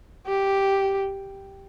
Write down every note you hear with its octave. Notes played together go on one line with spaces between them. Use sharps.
G4